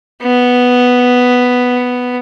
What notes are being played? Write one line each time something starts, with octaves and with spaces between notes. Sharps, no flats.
B3